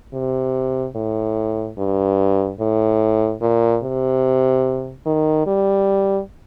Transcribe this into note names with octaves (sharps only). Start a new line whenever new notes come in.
C3
A2
G2
A2
A#2
C3
D#3
G3